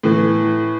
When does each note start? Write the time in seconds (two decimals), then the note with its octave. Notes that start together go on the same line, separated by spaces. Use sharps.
0.03 A2 E3